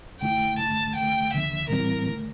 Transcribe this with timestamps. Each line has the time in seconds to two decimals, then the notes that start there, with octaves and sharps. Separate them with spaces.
0.21 F2 D3 A3 E4 G5
0.58 G2 D3 A3 A5
0.95 D2 D3 A3 G5
1.33 D2 D3 F3 A#3 E5
1.69 A2 E3 G3 C4 E4 A#4
2.07 D3 A3